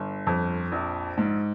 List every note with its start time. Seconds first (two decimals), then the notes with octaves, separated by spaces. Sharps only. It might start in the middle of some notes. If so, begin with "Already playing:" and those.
Already playing: G1
0.27 F2
0.72 A#1
1.18 G#2